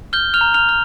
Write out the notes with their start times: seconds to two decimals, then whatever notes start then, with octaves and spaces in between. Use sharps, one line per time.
0.13 F6 G6 G7
0.34 F6 F7
0.41 A#5
0.54 F6 F7
0.69 F6